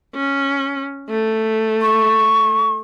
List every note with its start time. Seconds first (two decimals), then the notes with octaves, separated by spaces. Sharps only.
0.15 C#4
1.09 A3
1.82 C#6